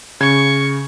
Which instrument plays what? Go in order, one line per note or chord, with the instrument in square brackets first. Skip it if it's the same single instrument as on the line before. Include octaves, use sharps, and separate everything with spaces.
[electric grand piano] C#3 G#6 [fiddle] C#6